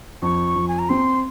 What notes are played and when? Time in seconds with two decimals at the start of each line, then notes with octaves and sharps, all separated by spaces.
0.22 F2 C#6
0.55 F2
0.68 G#5
0.79 A#5
0.89 C4 C6